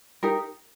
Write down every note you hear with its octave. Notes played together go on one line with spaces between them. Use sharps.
D#4 G4 A#4